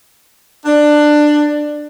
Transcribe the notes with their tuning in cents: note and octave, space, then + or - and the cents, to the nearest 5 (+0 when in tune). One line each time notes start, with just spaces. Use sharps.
D4 +15